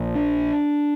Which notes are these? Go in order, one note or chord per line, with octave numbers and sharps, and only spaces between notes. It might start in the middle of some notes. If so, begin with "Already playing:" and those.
Already playing: A#1 A#2
D4